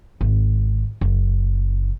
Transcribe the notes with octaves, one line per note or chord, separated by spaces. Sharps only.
G#1
F#1